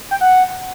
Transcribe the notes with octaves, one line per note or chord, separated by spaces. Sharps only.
G5
F#5